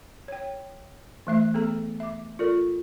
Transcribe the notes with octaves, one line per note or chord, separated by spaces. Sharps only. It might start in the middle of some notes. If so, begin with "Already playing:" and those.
C#5 G5
E3 A3 E5
B3 G#4 A4 A#5
E5 D6
F4 A4 A#4 D5